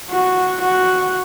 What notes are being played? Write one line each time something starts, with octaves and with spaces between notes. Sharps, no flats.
F#4
F#4